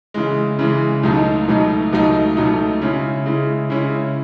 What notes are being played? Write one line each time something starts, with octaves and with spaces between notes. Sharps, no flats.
C#3 E3 G#3
C#3 E3 G#3
C#2 B2 F#3 A3 D#4
C#2 B2 F#3 A3 D#4
C#2 B2 F#3 A3 D#4
C#2 B2 F#3 A3 D#4
C#3 G#3 C#4 E4
C#3 G#3 C#4 E4
C#3 G#3 C#4 E4